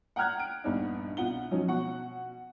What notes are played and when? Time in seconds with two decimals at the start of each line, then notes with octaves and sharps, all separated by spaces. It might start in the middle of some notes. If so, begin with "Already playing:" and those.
0.16 F#5 G5 A#5 F6 F#6 G#6
0.39 D7
0.64 A#1 G2 B3 D4 D#4
1.17 C2 B2 F4 F#5 G7
1.51 F3 F#3 C#4 D#4
1.68 B2 F#4 F#5 C#6